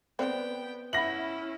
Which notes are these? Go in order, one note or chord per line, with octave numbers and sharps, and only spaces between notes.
B3 C4 D5 G5
C#4 E4 E5 F#5 B5 A#6 F#7